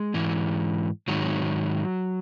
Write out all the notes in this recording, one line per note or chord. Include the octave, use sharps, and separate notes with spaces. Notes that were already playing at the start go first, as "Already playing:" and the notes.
Already playing: G#3
G#2 E3
G#2 D#3 F#3